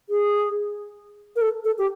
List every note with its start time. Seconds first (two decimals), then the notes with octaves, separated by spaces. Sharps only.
0.09 G#4
1.36 A#4
1.41 A4
1.64 A4
1.78 G4